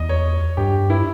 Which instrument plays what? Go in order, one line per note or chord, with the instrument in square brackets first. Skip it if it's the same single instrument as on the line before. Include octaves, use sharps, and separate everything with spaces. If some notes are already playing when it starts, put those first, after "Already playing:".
Already playing: [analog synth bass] E2 [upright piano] D#5
[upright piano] C#5
[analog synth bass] G2 [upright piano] G4
[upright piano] E4